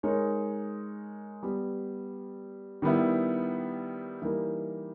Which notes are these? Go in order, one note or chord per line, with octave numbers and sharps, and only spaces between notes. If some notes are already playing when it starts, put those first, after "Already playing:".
G#3 D#4 A#4 C#5
G3 B3 G4
D#3 G3 B3 E4
E3 G3 A#3 D#4